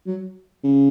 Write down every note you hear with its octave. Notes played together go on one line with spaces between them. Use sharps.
F#3
C#3